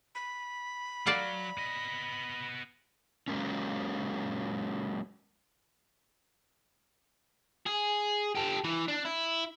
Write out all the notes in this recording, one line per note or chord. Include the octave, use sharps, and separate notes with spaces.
B5
F#3 D5 F5 F#5
B3 D#5
F#3 G#3 A#3 C#4
G#4
G4 A4
E3
D4
E4